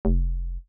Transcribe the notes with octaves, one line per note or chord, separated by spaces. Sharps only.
F1